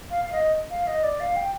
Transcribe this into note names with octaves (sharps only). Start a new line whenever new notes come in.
F5
F5
D#5
F5
D#5
D5
F5
G5